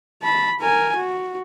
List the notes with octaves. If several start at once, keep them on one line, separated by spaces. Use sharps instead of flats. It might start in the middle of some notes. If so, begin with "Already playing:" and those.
A5 B5
A#4 G#5
F#4